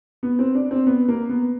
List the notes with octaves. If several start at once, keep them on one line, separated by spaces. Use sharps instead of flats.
B3
C4
D4
C4
B3
A#3
B3